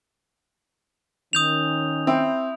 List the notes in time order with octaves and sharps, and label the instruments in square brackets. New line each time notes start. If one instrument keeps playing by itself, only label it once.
[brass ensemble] D#3 C#4 [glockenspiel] D#6 G6 F7
[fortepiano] C4 [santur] E4